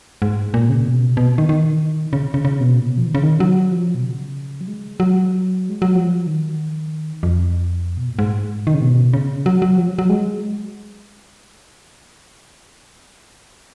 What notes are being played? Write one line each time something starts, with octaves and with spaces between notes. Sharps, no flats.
G#2
A#2
C#3
B2
B2
D#3
D#3
C#3
C#3
C#3
B2
A#2
B2
F3
D#3
C#3
D#3
F#3
F3
B2
C#3
F#3
G#3
F#3
G#3
F#3
F3
D#3
F2
B2
A#2
G#2
D#3
C#3
B2
C#3
F#3
F#3
F3
F#3
F#3
G#3